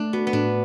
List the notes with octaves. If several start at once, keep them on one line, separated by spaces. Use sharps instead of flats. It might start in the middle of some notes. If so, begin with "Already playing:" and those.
Already playing: A3 D4
B3 F#4
B3
A2 D4